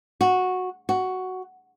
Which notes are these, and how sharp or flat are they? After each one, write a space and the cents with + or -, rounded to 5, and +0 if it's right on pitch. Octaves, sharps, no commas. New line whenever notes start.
F#4 -10
F#4 +5